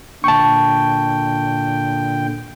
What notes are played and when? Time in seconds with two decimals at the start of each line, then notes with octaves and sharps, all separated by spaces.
0.24 A#2 D3 G5 A5 C#6